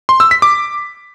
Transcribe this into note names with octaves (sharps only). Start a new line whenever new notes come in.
C6
E6
B6
D6